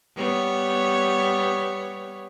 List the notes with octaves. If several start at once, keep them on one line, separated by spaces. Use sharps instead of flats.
G3 B3 C#5